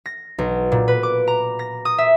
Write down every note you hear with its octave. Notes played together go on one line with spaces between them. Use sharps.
A#6
B1
A#2
B4
D6
A#5
A#6
D#6
E5